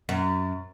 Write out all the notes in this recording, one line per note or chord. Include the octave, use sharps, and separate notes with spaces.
F#2